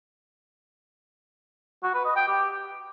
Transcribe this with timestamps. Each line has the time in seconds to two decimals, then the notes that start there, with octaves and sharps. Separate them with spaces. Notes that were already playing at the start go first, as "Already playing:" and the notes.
1.83 F#4
1.94 B4
2.05 D#5
2.16 G5
2.27 G4